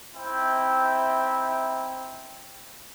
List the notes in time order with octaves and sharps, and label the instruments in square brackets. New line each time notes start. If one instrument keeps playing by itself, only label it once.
[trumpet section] C4 D#4 E4 E5 G5